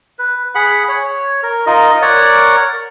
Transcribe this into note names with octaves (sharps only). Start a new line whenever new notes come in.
B4
G#4 F#5 B5
C#5
A#4
D#4 F4 A#4 D#5
A#4 C#5 D5 F#5